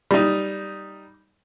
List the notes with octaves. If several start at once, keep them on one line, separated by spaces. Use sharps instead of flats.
G3 D#4